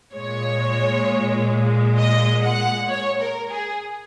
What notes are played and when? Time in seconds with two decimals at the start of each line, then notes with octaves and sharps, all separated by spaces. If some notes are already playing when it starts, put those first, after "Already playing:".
0.14 A#2 G#3 C#5
1.98 D#5
2.43 F#5
2.89 C#5
3.20 A#4
3.51 G#4